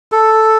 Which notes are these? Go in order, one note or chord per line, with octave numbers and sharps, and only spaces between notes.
A4